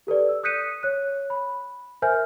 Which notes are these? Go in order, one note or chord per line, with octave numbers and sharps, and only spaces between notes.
G4 A4 B4 D5
E6
D#6 F#6 G6 B6 C#7 D#7
C#5 F#6
B5
A#4 C5 E5 G#5 F6 G6